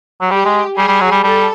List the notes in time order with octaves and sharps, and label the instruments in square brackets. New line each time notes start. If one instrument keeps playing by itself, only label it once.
[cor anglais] F#3
[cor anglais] G3 [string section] G4
[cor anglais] G#3
[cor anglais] G3 [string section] G#4
[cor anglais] G3
F#3
G3
[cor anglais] G3 [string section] A4